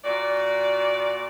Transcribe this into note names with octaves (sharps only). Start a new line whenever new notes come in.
A#2 F#4 D5